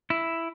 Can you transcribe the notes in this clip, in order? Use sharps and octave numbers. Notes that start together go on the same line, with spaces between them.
E4